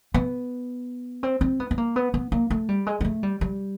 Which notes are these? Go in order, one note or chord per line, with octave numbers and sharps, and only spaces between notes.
B3
C4
C4
B3
B3
A#3
B3
B3
A#3
A3
G3
G#3
G#3
A3
G3
G3